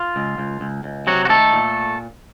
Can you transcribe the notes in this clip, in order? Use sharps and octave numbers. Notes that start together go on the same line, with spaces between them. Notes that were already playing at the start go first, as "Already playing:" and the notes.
Already playing: F4
C#2
C#2
C#2
C#2
C3 F#3 F#4
F#4
D#3 A3 A4
A#2